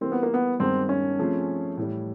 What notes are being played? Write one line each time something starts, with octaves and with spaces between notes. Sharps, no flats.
E3 G3 A#3 C4
B3
A#3
B3
G2 D#3 G#3 B3 C4 D#4
C#4
F3 A3 C4 F4 G#4
A2 E3 G3